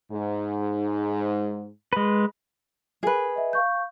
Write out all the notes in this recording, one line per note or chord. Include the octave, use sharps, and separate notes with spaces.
G#2
G#3 B4
G#4 A#4 B4
D#5 E5
F5 C#6 G6